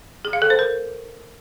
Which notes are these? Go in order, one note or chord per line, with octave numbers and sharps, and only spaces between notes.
G#4
F5
A4
C5
A#4